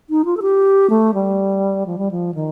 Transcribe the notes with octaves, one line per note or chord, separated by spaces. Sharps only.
D#4
F4
A4
G4
A3
G3
F3
G3
F3
D#3